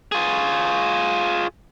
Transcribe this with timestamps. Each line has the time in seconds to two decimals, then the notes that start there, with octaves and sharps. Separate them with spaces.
0.12 F4 G#4